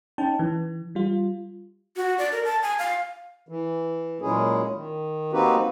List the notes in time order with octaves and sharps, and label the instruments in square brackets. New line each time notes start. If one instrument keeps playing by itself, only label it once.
[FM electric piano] C#4 D#4 G5 A5
E3
G3 F4
[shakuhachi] F#4
D5
A#4
A5
G#5
F5
[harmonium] E3
A#2 F#3 G#3 C#4 E4 G#4
D#3
A#3 C4 D#4 F#4 G4 B4